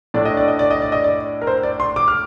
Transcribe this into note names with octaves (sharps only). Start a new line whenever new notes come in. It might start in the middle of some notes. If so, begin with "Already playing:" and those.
A2 A3 D4 D5
D#5
D5
D#5
D5
D#5
D5
D#5
D5
A#4
C5
D5
C6
D6
F6